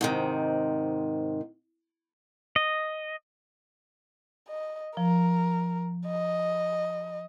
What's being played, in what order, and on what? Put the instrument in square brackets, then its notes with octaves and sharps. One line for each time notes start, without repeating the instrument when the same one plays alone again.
[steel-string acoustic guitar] G#2 C3 D#3
[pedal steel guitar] D#5
[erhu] D#5
[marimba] F3 [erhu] A#4
[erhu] D#5